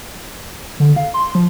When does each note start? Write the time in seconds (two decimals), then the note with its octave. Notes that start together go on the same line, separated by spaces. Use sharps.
0.80 D3
0.96 F5
1.14 C6
1.35 F3